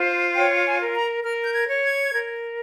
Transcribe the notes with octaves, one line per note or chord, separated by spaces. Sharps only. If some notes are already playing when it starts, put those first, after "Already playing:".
Already playing: F4 C5
C#5 G5
G#5
A#4
A#5
A#4 F6
G6
G#6
C#5
G#6
A#4